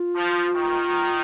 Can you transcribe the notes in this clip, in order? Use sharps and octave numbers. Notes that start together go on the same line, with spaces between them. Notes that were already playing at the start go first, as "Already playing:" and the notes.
Already playing: F4
F3
D#3